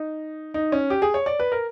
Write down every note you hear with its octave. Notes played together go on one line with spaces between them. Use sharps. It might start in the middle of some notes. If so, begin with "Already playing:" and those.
Already playing: D#4
D#4
C#4
G4
G#4
C#5
D5
B4
A#4